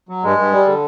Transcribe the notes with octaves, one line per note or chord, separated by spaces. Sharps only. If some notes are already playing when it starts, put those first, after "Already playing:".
F#3
G2 G#3
G2
G3
D3